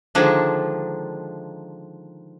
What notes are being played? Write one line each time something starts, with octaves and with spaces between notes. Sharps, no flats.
D3 D#3 F3 G#3 A#3 D4